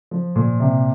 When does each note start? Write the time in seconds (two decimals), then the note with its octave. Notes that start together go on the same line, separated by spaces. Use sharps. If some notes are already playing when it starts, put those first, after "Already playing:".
0.11 F3
0.36 A#2
0.60 C3